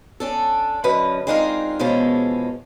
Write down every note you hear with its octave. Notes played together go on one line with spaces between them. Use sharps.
C#4 D4 A4
F#2 D3 C#4 B4 D#5
G#3 C4 D4 D#4 F4 A#4
E2 B2 F3 G#3 C#4 A4